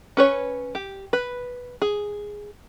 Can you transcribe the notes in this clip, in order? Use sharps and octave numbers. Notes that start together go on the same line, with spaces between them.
C#4 B4 C#5
G4
B4
G#4